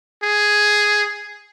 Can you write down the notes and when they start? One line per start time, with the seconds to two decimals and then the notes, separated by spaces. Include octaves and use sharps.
0.23 G#4